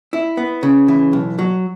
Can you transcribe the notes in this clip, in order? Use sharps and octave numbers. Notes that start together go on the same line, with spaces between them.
E4
B3
C#3
E3
B1
F#3